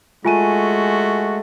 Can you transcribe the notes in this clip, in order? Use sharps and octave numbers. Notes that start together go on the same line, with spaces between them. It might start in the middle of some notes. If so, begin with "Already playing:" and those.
G#3 A3 F4 F#4 G#5 D#7